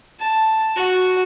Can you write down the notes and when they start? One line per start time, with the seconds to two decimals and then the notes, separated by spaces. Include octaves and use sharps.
0.20 A5
0.76 F#4